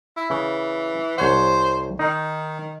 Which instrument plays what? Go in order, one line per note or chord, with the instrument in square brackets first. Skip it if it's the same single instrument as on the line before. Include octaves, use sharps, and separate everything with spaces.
[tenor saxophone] E4
[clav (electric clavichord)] C#3 [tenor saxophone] E3
[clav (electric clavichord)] C2 C#5 F#5 [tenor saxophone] C5
[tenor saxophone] D#3 [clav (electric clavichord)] D#4